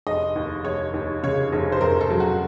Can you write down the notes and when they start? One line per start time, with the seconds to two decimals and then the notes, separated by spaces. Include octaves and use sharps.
0.07 F1 D#5
0.36 D#2
0.64 F1 C#5
0.94 D#2
1.23 C#3 C#5
1.53 F1
1.72 C5
1.81 F1 A#4
2.01 A4
2.10 F#3
2.20 F#4